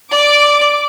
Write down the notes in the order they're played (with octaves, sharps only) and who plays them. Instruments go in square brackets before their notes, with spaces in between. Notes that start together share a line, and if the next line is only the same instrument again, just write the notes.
[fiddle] D5 [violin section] D6